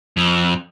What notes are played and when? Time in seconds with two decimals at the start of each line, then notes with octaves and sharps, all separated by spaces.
0.17 F2